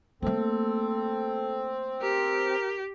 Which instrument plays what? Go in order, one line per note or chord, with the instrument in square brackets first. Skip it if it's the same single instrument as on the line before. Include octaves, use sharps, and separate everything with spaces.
[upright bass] A3 A#3 [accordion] C4 [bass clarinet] A4
[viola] G4 [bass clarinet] A#4